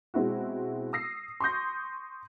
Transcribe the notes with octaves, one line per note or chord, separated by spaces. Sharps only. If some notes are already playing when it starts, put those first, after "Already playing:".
B2 G#3 C4 E4 F#4
D#6 E6 A#6 C7
C6 C#6 D#6 G6 A#6